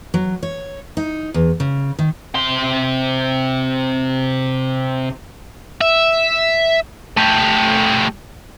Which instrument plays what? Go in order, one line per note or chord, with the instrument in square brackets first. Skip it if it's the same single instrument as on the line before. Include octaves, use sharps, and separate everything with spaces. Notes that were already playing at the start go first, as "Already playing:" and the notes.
[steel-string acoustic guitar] F#3
C#5
D#4
E2
C#3
D#3
[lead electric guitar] C3 C6
[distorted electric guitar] E5
A3 G4